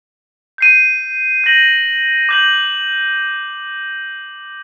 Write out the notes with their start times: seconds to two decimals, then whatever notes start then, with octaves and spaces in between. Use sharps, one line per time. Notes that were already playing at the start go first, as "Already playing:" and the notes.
0.58 G6 C7 D#7
1.44 G6 A#6 F#7
2.29 D6 G6 A#6 F#7